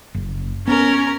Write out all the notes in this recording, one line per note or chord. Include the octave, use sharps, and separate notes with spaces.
F#1
B3 C#4 A#4